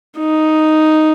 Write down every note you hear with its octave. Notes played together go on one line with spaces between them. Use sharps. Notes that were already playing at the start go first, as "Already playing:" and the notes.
D#4